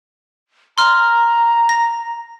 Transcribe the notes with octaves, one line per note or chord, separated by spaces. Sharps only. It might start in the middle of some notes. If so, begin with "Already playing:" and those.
A#5 C6 F6
A#6